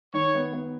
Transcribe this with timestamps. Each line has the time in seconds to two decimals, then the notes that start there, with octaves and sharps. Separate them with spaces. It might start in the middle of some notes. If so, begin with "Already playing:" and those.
0.14 D#3 C#5
0.35 B3
0.53 B3